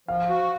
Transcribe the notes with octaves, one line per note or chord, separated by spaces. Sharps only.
F3 F5
F#4